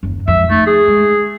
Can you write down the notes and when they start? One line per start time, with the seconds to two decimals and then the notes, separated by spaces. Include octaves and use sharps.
0.03 F#1 D#2
0.28 F2 G#2 E5
0.50 A3 D#4
0.67 G#4
0.88 G#3